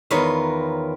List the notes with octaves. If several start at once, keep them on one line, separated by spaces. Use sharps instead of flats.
E2 D#3 F4 A#4 B4 C#5